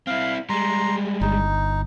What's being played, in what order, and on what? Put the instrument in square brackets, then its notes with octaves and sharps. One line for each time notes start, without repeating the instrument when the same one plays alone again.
[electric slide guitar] C4 E4 [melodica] F5
[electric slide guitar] G3 G#3 [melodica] A#5 C6
[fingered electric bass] G1 [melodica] D#4